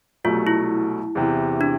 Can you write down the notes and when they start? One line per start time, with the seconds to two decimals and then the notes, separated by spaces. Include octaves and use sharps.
0.24 C2 B2 F#3 A3 F4
0.47 E4
1.15 E2 C3 E3
1.61 D4